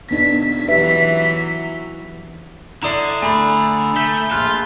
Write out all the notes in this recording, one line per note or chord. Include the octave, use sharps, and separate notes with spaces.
B3 D4 D#4 B6
E3 F#3 G4 B4 E5
D3 E4 D5 A#5 D#6 C7
A3 G#5 B5
A3 G6 B6 G7
A#1 F4 F#6